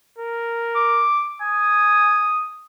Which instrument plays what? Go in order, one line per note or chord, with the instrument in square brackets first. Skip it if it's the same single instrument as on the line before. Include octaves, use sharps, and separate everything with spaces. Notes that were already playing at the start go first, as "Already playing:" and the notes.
[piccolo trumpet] A#4
[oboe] D6
[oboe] G#5 [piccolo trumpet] D#6